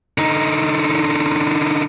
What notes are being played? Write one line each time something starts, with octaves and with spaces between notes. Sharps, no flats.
D3 D#4